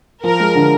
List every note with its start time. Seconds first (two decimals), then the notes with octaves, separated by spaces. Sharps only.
0.24 F3 A#4
0.40 G#3
0.55 D3